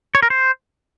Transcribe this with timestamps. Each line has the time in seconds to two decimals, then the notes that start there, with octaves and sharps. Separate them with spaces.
0.15 C#5
0.23 A#4
0.30 C5